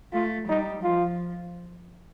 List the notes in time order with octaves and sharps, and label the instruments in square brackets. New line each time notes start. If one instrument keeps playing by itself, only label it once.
[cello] A3 [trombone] F4
[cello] G3 [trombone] D#4
[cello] F3 [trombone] F4